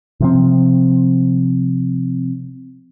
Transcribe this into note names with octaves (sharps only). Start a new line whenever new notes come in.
C3 F3 C4